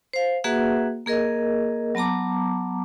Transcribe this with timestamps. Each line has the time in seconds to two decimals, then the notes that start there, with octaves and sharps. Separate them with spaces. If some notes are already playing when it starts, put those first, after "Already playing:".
0.13 C5 F5
0.44 A#3 F#4 G#4 B4 E5 F#5
1.06 A#3 G#4 A#4 D#5
1.95 F#3 B3 A5 A#5 D6